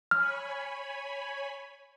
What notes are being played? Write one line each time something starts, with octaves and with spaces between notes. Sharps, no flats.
C#5 G#5 B5 F6